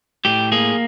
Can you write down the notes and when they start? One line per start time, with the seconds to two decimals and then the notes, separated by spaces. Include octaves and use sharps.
0.25 A2 G4
0.52 A#3 G#4